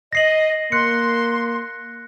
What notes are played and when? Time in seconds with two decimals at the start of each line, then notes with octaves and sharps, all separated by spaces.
0.13 D#5 A#6 C7 F#7
0.72 A#3 C6 F#6 C#7